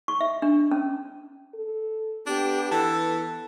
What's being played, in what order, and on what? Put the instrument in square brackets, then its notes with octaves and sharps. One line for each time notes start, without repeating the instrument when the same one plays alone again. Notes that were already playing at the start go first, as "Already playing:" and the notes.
[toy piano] C#6
E5
D4
C#4
[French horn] A4
[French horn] B3 [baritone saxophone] D4 [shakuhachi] G4
[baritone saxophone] E3 [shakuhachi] A4 [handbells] A5